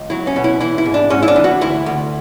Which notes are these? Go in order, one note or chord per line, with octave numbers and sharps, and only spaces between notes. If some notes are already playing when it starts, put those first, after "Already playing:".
Already playing: C#2
F#3 E4
C#4
B2
E4
E3 E4
E4
G#2
D4
G#2 C#4
E4
D4
E3
F#4
D2 E4
D2